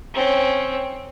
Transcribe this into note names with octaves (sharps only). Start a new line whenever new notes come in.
C4 C#4